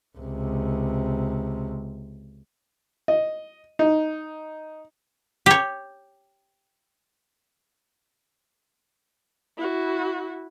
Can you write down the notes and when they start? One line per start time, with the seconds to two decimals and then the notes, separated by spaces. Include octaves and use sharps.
0.18 C#2 C3
3.08 D#5
3.79 D#4
5.46 G4 C#5
9.58 E4 F#4